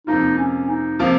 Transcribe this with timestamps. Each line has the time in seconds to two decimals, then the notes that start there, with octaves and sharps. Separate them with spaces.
0.07 F2 C3 F3 A#3 D#4 F4
0.38 C#4
0.69 D#4
0.99 C3 F3 A#3 F4